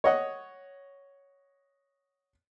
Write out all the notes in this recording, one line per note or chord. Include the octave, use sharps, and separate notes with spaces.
C#5 D#5 F#5